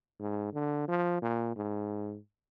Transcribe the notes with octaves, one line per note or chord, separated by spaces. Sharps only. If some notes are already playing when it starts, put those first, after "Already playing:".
G#2
D3
F3
A#2
G#2